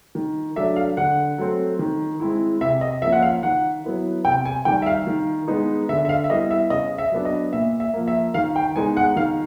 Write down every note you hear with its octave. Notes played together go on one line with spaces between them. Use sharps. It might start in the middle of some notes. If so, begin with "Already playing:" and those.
D#3
F#3 A3 D4 E5
F5
D3 F#5
F#3 A3 C4
D#3
G#3 C4 E4
C3 E5
D#5
F3 A#3 C#4 E5
F#5
F5
D#3 F#5
F#3 B3 E4
C3 G5
G#5
D#3 G3 G5
E5
F5
D#3
G#3 B3 D#4
D3 E5
E5
F5
E5
G3 B3 E4 D#5
E5
C#3 D#5
E5
F#3 B3 D4
D#5
A#2 E5
E5
F3 A#3
E5
D#3 F5
G5
G#3 B3 D#4 G#5
F#5
D#3 F5